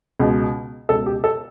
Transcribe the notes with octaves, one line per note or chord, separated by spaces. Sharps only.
C#2 B2
C#2 B2 A4
G4
A4